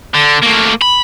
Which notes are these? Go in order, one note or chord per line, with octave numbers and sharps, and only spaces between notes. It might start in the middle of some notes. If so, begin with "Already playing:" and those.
D3
A3 A#3
B5